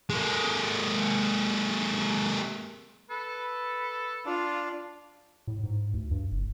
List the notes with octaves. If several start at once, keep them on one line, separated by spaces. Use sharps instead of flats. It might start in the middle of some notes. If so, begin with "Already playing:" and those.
G#3 A#3
A4 B4
D4 F4
A2
G#2
D2
G2
F#1